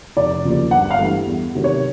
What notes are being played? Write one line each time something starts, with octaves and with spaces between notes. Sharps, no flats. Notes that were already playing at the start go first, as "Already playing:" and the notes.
F1 D5
D#2 C#3 F3
G1 F#5
F5
G2 E3 A3
E2
C3 D#3 F#3 A3
C#5